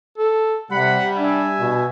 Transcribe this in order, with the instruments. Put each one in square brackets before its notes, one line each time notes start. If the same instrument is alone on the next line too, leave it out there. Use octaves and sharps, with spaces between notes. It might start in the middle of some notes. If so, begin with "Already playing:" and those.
[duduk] A4
[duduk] C3 [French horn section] G3 [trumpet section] F#5 B5
[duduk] D4 [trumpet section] E5 G#5
[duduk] B2